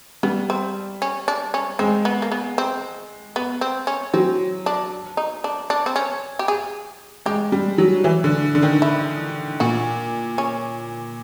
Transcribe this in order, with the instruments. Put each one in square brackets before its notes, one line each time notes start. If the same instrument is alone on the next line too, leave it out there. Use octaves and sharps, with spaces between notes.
[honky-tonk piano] G3 [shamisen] B3
[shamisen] C4
C#4
D4
C#4
[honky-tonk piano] G#3 [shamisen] C4
[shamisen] B3
A#3
B3
C4
B3
C4
C#4
[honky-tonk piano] F#3 [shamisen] C4
[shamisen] D4
D#4
D4
D4
C4
C#4
G4
G#4
[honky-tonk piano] G#3 [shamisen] G4
[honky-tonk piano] G3
F#3
E3
D3
D3
D#3
[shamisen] E4
[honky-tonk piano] A#2 [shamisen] F#4
[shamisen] C#4